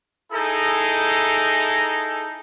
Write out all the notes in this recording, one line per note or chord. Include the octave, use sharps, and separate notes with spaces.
D#4 E4 G#4 A4 A#5